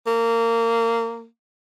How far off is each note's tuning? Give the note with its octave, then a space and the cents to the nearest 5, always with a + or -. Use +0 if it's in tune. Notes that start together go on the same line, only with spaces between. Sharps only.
A#3 -20